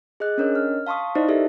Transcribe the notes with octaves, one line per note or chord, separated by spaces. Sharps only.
G#4 D#5 F#6
C#4 D4 A#4 C#5 D#5
F6
F5 A5 C6 C#6 D#6
D#4 E4 C5 D5 D#5
E4 G4 A4 A#4 D5 E5